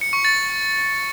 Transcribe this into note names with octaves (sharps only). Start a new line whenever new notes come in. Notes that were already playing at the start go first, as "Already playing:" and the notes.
C#7
C#6
A6